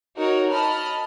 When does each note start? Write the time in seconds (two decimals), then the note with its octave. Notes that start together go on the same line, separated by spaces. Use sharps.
0.17 D#4 F#4 A#4 C#5
0.51 D#5 A5 B5 F6